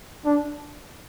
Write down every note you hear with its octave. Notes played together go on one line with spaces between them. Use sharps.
D4